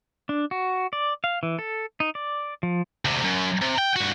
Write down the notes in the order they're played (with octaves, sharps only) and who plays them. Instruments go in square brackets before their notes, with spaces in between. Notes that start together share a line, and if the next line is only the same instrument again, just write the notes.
[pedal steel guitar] D4
F#4
D5
F5
E3
A4
D#4
D5
F3
[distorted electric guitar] D2 C3
F#2
C3
G5
G2 F#4